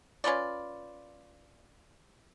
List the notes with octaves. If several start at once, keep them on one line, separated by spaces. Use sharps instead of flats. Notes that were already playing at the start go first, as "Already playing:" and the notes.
C#4 F4 B4 D5